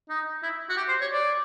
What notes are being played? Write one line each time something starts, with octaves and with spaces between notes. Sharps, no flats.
D#4
E4
F#4
G4
C5
C#5
D5